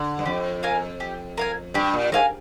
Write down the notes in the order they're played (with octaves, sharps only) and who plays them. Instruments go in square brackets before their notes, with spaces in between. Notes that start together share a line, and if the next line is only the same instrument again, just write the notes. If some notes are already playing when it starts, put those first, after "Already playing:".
Already playing: [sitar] D3
G2
[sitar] F2 [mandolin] G4
[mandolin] A#4 F5 G#5
G4
A#4 F5 G#5
[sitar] G2 [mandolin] G4
[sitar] A#2
[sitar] G#2 [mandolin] A#4 F5 G#5